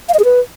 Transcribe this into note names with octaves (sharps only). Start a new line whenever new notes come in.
F5
D#5
G#4
B4